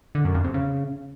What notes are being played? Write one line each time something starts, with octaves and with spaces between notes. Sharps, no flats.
D3
F#2
F2
C3
C#3